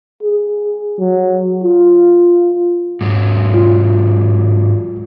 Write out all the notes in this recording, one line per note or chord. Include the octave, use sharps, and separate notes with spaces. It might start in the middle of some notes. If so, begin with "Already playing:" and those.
G#4
F#3
F4
G#2 F#3
F4